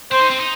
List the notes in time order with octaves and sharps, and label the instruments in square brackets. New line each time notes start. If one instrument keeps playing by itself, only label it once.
[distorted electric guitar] C4 [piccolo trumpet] C5
[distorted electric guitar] D#4
C4
D#4